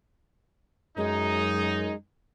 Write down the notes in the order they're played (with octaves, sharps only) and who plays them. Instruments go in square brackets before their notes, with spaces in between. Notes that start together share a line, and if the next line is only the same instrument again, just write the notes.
[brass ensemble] F#2 [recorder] G#3 [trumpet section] D#4